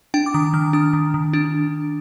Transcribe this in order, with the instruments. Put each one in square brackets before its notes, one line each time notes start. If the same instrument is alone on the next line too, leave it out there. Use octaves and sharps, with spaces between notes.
[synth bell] D4 G5
D6
D#3 D#6
D#3 F6
D4 D#6
D#3
D#3
D4